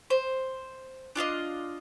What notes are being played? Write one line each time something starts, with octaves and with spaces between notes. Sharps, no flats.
C5
D4 F4 C#5 D#5